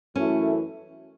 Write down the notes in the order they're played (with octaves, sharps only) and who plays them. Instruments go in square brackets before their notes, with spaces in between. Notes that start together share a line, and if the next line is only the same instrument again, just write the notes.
[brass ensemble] F#2 E3 A3 E4 [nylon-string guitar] C#4